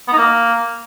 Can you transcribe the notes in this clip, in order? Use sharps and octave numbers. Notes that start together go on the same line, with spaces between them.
B3
D#4
A#3